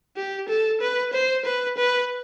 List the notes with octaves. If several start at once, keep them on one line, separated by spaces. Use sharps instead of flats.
G4
A4
B4
C5
B4
B4